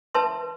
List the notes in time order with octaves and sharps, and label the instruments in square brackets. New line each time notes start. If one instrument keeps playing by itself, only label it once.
[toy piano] B4 E5 A5 C6